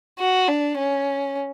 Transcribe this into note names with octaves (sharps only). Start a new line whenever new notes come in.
F#4
D4
C#4